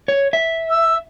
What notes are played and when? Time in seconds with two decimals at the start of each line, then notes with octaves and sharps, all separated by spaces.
0.08 C#5
0.33 E5
0.70 E6